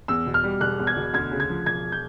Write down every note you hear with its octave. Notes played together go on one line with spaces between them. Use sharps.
E2 E6
B2
F6
G3
E1 F#6
E2
G#6
B2
D2 G#6
C#3
G#6
F3
E1 G#6
G6